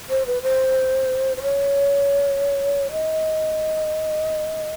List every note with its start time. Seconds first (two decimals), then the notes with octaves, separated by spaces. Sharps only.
0.10 C5
0.26 B4
0.42 C5
1.37 C5
1.42 C#5
2.92 D#5